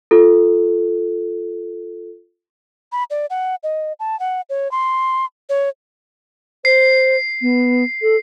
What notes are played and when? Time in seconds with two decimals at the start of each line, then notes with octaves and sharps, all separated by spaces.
0.11 F4 A4
2.92 B5
3.10 D5
3.30 F#5
3.63 D#5
4.00 A5
4.20 F#5
4.50 C#5
4.71 C6
5.49 C#5
6.65 C5 C7
7.41 B3
8.02 A4